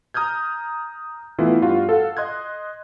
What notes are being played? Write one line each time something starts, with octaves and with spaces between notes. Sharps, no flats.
A#5 D#6 F6 G6 G#6
E3 A3 B3 E4 F4
G2 F4 F#4 F5
A4 F5 F#5
D#5 C6 F#6 G#6